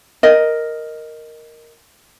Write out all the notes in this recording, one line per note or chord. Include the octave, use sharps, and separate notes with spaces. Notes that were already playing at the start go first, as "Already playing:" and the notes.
A#4 D#5